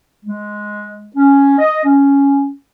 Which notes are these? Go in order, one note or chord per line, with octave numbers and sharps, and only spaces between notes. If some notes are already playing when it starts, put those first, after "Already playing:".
G#3
C#4
D#5
C#4